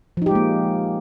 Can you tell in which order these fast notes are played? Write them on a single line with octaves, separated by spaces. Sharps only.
F3 D#4 G4 G#3 A#3